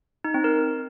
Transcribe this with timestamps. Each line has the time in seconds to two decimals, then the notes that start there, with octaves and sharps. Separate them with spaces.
0.24 D#4
0.34 C4
0.44 A#4